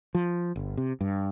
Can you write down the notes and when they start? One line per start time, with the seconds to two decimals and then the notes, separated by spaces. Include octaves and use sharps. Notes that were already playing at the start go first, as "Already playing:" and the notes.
0.15 F3
0.56 G1
0.77 C3
1.01 G2